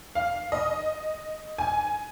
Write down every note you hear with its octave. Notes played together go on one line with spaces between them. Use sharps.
F5
D#5
G#5